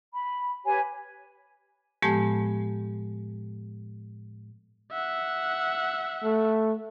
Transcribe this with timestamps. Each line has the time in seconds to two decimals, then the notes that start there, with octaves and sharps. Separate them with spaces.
0.14 B5
0.65 G4 B4 C#5 G#5
2.02 A2 F3 G#3 B3 G4 A5
4.92 E5 F#5
6.23 A3